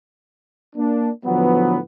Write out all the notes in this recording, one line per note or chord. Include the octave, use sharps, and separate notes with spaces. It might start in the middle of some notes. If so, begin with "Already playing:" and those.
A#3 D4
A2 D3 F3 F#3 B3